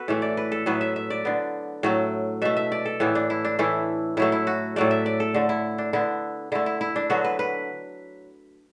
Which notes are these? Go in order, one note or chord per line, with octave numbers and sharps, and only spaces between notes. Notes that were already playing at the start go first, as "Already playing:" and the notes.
Already playing: B3 F#4 A4 B4
A2 E3 A3
D5
B4
A4
A2 F#3 B3 B4
E5
E5
D5
D3 B3
A2 F#3 A3
B2 A3 E5
E5
D5
A4
A2 E3 B3 E4
D4
E4
D4
A2 E3 A3 E4
A2 F#3 A3 E4
E4
F#4
A2 F#3 A3 D5
E5
D5
A4
D3 A3
E4
D4
D3 B3 E4
D3 A3 E4
E4
E4
D4
D3 F#3 B3 F#4
B4
B4